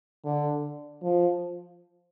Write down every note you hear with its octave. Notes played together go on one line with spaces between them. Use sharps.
D3
F3